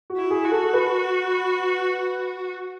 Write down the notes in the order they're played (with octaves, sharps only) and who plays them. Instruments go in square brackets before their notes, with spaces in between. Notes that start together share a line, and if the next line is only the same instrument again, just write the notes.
[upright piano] F#4
[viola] E4
[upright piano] G#4
[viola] F#4
[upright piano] A4
B4